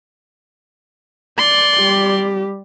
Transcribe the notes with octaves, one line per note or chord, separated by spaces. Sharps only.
D5 C6
G3 G4